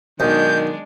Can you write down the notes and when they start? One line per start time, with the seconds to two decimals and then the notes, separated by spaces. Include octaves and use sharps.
0.20 B1 D#3 G#3 D4 G6